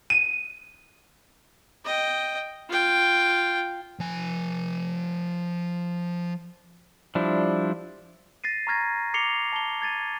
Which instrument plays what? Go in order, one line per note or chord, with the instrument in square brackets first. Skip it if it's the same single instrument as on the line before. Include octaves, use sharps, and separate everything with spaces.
[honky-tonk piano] D#7
[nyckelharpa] D#5 G5
F4 G5
[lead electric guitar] F3 G#5
[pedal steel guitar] F3 G3 D4 E4
[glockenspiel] A6 A#6 C7 D#7
A#5 C#6 F6 G#6 A#6
D6 C7 C#7 F7 G7
A5 G7
G#6 A6 D#7